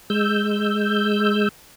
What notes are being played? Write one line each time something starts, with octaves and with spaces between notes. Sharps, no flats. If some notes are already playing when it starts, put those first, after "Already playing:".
G#3 E6 G6